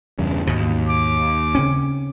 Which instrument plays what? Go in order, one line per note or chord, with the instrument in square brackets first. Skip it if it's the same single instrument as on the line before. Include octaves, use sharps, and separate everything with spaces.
[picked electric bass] E2 G2 C#3
[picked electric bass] D#2 [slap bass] G#2 B2
[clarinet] D6
[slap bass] C#3 C4 C#4